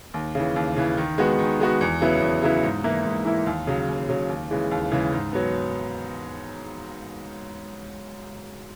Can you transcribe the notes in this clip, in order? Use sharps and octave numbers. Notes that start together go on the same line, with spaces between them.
D#2
C#3 E3
D#2
C#3 E3
D#3
G#3 B3 F#4
D#3
G#3 B3 F#4
E2
C#3 F#3 B3 E4
E2
C#3 F#3 B3 E4
G#2
E3 A#3 E4
G#2
E3 A#3 E4
D#2
C#3 F#3
D#2
C#3 F#3
D#2
C#3 E3 G#3
D#2
C#3 E3 G#3
G#2
F#3 B3